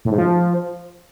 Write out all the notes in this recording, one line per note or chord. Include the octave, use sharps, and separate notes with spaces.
A2
G#2
F3